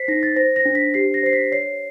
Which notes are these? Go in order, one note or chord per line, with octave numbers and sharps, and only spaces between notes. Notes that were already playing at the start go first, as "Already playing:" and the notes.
Already playing: C5 B6 C7
D#4 A#6
A6
C5 A#6
A#6
D4
B6
G4 C7
A#6
C5 C7
B6
C#5 C7